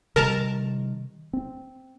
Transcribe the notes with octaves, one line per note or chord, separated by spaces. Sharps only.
C3 D#3 G3 A#4 A5 A#5
C4